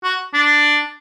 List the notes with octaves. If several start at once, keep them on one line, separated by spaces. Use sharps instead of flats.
F#4
D4